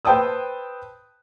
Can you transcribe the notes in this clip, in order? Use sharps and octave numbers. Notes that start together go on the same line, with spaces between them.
B4 C5 G5 A5 D#6 E6